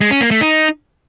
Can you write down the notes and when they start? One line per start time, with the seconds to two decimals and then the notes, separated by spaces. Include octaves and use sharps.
0.01 G#3
0.11 C#4
0.21 A#3
0.31 A3
0.41 D#4